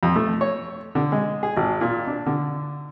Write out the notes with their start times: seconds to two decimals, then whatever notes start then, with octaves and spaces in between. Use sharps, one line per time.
0.03 F2
0.16 A3
0.41 C#5
0.95 D3
1.12 G#3
1.43 G#4
1.57 G#1
1.81 A#2
2.07 D4
2.26 D3